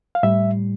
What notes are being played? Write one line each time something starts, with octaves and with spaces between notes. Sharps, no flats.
F5
A2 G3 E5